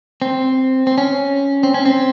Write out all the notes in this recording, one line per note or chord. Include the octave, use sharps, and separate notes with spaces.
C4
C4
C#4
C4
C#4
C4